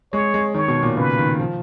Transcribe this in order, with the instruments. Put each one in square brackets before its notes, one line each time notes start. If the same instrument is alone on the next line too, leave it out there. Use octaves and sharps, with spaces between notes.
[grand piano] G#3 [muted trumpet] C#5
[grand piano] G#3
[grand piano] D#3 [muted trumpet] C#5
[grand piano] B2
A#2
[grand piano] C#3 [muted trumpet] B4
[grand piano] D#3
F3